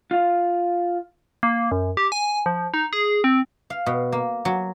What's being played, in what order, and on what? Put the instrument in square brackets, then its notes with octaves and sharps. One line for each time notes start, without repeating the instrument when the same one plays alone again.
[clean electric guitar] F4 F5
[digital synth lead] A#3
F#2
G4
G#5
F3
D#4
G#4
C4
[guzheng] F5
B2
A#3
F#3